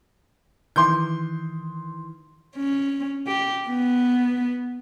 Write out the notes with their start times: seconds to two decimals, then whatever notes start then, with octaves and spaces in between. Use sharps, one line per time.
0.76 D#3 E3 C6 G6
2.56 C#4
3.27 G4
3.69 B3